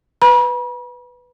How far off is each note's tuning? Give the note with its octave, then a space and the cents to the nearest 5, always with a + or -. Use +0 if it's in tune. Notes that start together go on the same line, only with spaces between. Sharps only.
B4 +5 B5 -40